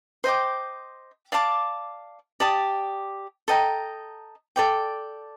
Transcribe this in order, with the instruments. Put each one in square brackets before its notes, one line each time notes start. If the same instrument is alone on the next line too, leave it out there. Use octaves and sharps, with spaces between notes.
[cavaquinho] C5 D#5 G5 D6
D5 F5 A5 D6
G4 D5 A5 D#6
A4 D#5 G5 A#5
A4 D5 G5